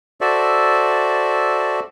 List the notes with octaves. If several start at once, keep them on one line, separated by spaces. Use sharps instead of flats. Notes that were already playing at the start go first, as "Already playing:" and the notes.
F#4 A4 C5 D5 E5